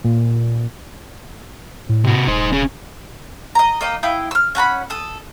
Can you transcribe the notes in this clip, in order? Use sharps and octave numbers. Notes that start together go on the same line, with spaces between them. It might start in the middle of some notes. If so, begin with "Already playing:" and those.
A#2
A2
C3 F#4
D#1 D#4 C5
C#4 G#4
D#5 A#5
A#3 D#5 G5
E4 F5 G5 D#6
E6 F6
C#4 F#5 A#5 B5
A4 D#6